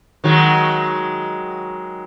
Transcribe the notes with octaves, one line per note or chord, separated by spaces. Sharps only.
D#3 F#3 G#3